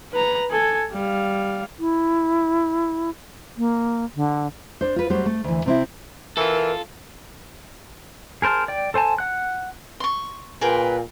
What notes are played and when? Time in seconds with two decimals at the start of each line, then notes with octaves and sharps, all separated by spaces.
0.12 B4 A#5
0.51 A4 G#5
0.92 G3 F5
1.79 E4
3.58 A#3
4.16 D3
4.81 D4 C5
4.96 F4 B4
5.10 F#3 G3 A3 C4 F#4 C5
5.26 A3
5.44 D2 E3
5.66 C3 C4 E4
6.37 E3 F4 A4 A#4
8.42 G#4 A#4 C5 A5 F6
8.68 D5 G5
8.94 A4 C5 G#5 A5
9.18 F#5 F#6
10.00 C6 C#6
10.61 A#2 G#4 A#4 B4 G5